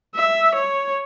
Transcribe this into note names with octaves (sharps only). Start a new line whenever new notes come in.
E5
C#5